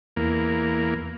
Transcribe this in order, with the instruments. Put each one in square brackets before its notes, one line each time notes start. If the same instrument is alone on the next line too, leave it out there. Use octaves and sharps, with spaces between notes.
[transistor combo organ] E2 A#3